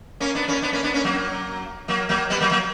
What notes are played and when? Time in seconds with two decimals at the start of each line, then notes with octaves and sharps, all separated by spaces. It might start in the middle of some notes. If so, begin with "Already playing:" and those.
0.20 A#3 C#4
0.34 B3 D4
0.48 A#3 C#4
0.62 B3 D4
0.73 A#3 C#4
0.83 B3 D4
0.94 A#3 C#4
1.04 F#3 A#3
1.88 F#3 A#3
2.09 F#3 A#3
2.30 G3 B3
2.40 F#3 A#3
2.51 F#3 A#3